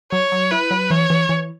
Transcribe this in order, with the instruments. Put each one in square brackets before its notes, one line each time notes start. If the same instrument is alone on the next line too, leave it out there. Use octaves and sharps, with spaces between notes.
[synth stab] F#3 [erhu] C#5
[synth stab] F#3
[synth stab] E4 [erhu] B4
[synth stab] F#3
[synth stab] E3 [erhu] C#5
[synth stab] E3
E3